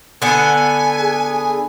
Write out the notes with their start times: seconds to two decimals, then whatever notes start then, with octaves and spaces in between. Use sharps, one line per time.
0.22 D3 B3 G#5
1.01 G#4